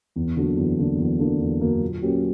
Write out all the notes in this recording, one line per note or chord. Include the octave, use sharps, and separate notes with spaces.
E2
D3 F#3 A#3 D4
E2
D3 F#3 A#3 D4
E2
D3 F#3 A#3 D4
E2
D3 F#3 A#3 D4
A#2
F#3 A#3 C#4 G4